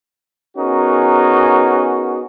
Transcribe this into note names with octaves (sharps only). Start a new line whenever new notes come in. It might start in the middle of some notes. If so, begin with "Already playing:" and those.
B3 C#4 D#4 F#4 G#4 A#4